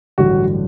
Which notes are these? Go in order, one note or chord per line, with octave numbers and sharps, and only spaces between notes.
A1 G2 D3 F#3 F#4